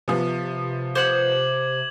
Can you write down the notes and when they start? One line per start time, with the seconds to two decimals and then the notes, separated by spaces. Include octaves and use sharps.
0.08 C3 F3 B3
0.95 C5 F#5 D6 G6 G#6 F#7